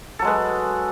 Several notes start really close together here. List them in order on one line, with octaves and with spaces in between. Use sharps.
A4 F#3 G#3 B4